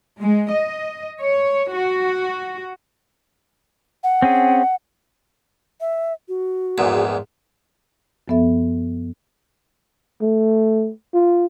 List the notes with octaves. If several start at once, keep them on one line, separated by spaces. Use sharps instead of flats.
G#3
D#5
C#5
F#4
F#5
C4 C#4 G#4
E5
F#4
A#1 E2 G#2
F#2 F3 B3 A4 E5
A3
F4